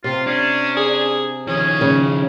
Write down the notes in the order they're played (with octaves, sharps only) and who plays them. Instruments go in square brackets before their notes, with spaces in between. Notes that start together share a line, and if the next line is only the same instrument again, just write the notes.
[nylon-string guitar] C3 [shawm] F4
[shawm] C#4 [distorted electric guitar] D4
[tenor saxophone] G#4
[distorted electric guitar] D#3 F3 [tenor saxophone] C#4 [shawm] G#4
[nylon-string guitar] C#3